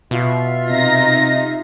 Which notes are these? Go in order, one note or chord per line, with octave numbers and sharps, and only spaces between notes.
B2 F4 E5
C3 D#4 A#6